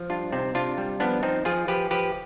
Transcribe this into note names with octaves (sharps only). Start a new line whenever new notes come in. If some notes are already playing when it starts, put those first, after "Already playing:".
Already playing: F3
G3 D4 F4
C3 C4 D#4
C3 D4 F4
G3
F3 B3 D4
F3 C4 D#4
F3 F4 G#4
F3 G4 B4
F3 G4 B4